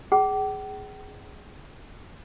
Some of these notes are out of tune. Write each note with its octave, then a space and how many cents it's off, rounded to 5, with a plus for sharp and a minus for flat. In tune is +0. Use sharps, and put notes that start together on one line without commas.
G#4 +0 G5 -45